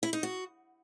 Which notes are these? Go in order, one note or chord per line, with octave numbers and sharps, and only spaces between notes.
E4
D#4
F#4